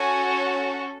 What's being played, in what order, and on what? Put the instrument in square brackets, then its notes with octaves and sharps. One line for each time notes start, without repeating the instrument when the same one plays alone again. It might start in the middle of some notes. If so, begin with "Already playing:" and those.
Already playing: [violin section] C#4 F#4 A4 G#5